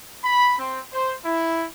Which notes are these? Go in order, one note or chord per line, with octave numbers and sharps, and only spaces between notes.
B5
C4
C5
E4